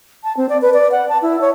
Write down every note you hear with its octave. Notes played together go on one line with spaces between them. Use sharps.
A5
C4
D5
B4
D5
F#5
A5
E4
C#5